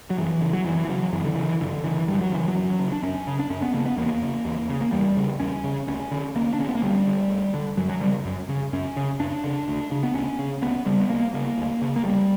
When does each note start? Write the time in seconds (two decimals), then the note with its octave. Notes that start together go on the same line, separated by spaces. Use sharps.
0.10 F#3
0.18 F#2 E3
0.41 C#3
0.53 F#3
0.65 F#2 E3
0.85 E3
0.89 C#3 F#3
1.12 F#2 E3
1.25 D3
1.36 C#3 E3
1.60 F#2 D3
1.84 C#3 E3
2.08 F#2 G3
2.21 F#3
2.32 C#3 E3
2.48 F#3
2.55 F#2
2.79 C#3
2.92 D4
3.03 F#2 C#4
3.27 C#3
3.39 D4
3.50 F#2 C#4
3.62 B3
3.74 C#3 A#3
3.85 B3
3.97 E2 A#3
4.22 C#3
4.45 E2
4.69 C#3
4.81 A#3
4.92 E2 G3
5.17 C#3
5.40 E2 C#4
5.64 C#3
5.87 D2 C#4
6.11 D3
6.35 D2 A#3
6.54 D4
6.59 D3 C#4
6.69 B3
6.75 A#3
6.83 D2 G3
7.07 D3
7.30 D2
7.54 D3
7.77 F#2 F#3
7.89 F#3
8.01 C#3 G3
8.25 F#2
8.49 C#3
8.73 F#2 C#4
8.96 C#3
9.20 F#2 D4
9.44 C#3
9.68 D2
9.91 C#3
10.03 B3
10.15 D2 C#4
10.39 C#3
10.62 D2 B3
10.86 C#3 G3
11.00 B3
11.10 D2 A#3
11.34 C#3 A#3
11.58 D2
11.82 C#3
11.96 A#3
12.05 D2 G3